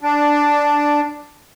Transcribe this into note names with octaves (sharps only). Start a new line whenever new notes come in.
D4